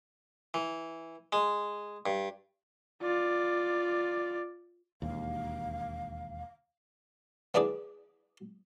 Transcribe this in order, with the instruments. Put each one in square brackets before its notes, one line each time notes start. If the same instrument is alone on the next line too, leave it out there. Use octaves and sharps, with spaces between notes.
[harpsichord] E3
G#3
G2
[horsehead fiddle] F4 D5
[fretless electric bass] E1 D#2 [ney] F5
[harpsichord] B3 D4 E4 G#4 D5